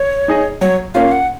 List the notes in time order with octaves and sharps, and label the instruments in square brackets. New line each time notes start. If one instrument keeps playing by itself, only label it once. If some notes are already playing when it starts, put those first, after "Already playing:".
Already playing: [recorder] C#5
[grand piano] D#4 G#4 D#5
[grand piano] F#3 [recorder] C#5
[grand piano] A#3 C#4 F4 [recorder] F5
[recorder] F#5